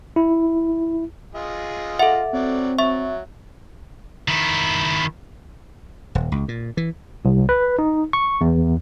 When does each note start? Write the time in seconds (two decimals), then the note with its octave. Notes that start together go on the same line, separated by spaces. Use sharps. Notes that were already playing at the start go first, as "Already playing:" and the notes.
0.16 E4
1.35 F4 G#4 D#5
1.99 A4 E5 F#5
2.34 F#3 C4 D5
2.79 F#3 E5 C#6
4.28 D#3 E4
6.15 D#1
6.32 C#2
6.48 A#2
6.77 E3
7.25 C2
7.49 B4
7.79 D#4
8.13 C#6
8.41 E2